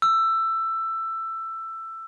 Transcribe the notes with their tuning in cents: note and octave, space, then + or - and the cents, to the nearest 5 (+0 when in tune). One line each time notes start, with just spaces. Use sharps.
E6 +15